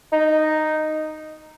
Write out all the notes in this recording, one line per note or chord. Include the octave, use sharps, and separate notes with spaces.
D#4